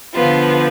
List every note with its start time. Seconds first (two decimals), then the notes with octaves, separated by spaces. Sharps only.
0.15 D3 F3 B3 F4